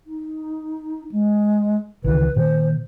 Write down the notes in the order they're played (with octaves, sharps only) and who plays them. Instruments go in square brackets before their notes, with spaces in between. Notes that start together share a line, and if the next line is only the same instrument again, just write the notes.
[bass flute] D#4
G#3
[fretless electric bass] C#2 D#3 E3 [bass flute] B4
[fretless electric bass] A#2 D#3 [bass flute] C5